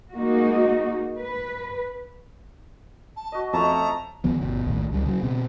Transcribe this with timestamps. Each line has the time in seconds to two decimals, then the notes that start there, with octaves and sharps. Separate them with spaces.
0.14 G#3 A#3 D#4 F#4
1.19 B4
3.16 A5
3.32 F#4 D#5
3.53 F2 A3 C#4 G5 A5 A#5
4.24 D#2 C#3 F3 B3
4.41 G1 B2
4.66 A#1 D#2 A2
4.92 C#2 G3
5.06 C#3 E3 F#3
5.23 B2 C4